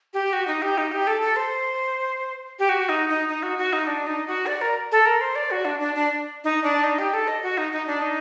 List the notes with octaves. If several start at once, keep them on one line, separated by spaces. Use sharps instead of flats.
G4
F#4
D#4
G4
D#4
G4
A4
A4
C5
G4
F#4
D#4
D#4
D#4
F#4
F#4
D#4
D4
D#4
F#4
D5
A#4
A4
A#4
C5
D5
F#4
D4
D4
D4
D#4
D4
D#4
G4
A4
D#5
F#4
D#4
D#4
D4
D#4